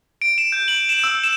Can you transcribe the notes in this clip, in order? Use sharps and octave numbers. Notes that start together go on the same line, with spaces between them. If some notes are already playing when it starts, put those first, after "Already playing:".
D7
E7
G6
F#7
E7
E6
E7